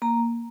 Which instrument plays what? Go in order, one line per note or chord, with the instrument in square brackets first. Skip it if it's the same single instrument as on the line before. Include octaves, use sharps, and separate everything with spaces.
[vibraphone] A#3 A#5